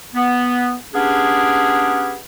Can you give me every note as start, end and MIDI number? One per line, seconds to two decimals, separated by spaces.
0.15 0.73 59
0.94 2.16 59
0.94 2.16 61
0.94 2.16 62
0.94 2.16 67
0.94 2.16 68